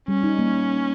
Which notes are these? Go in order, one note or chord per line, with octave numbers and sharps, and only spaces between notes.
G3 C#4
D#4
A#3